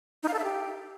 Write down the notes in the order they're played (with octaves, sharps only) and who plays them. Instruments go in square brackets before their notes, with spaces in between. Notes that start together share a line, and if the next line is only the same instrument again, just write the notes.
[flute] D#4
F5
A4
E5
G4